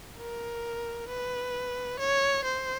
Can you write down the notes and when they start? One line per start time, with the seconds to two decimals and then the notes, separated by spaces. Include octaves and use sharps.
0.18 A#4
1.08 B4
1.99 C#5
2.44 C5